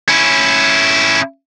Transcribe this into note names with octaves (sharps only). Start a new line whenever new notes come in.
C#4 E4